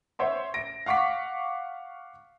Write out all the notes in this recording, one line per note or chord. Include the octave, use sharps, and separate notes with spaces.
C5 C#5 E5 C6
A#6 D7
F5 F#5 C#6 D6 B6